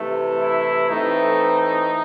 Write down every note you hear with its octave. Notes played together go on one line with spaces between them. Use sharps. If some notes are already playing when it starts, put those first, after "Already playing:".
Already playing: C3 E3 A3
E4
A2 E3 A3 C4 D#4